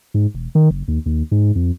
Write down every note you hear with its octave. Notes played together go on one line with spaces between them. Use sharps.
G#2
E1
D#3
F#1
D#2
D#2
G#2
F2